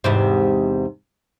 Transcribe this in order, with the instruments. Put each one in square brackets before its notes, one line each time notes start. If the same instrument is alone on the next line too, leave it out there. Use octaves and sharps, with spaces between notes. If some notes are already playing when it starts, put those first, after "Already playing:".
[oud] E2 G#2 C3